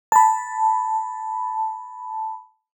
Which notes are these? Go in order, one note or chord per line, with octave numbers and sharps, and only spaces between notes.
A5 B5